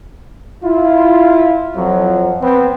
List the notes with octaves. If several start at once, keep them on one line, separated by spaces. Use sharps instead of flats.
E4 F4
F2 F3 F#3
B3 C4